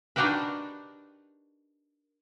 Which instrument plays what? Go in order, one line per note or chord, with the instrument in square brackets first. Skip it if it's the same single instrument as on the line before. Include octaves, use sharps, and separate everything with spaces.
[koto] D4 D#4 F#4 G4 A#4 B4